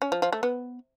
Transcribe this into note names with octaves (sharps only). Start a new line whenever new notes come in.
C#4
F3
F3
A3
B3